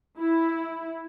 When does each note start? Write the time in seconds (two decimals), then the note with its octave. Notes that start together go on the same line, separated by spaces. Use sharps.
0.19 E4